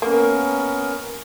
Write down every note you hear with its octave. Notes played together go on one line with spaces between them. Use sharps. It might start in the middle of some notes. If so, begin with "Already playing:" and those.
A#3 B3 C#4 A#4